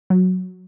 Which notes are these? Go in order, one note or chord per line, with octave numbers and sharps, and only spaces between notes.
F#3